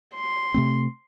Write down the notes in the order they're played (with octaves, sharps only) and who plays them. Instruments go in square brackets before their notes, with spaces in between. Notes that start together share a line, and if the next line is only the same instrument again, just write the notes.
[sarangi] C6
[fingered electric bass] C3 A3 C4